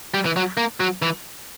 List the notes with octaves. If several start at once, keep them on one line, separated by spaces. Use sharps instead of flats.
G3
E3
F#3
A#3
F#3
E3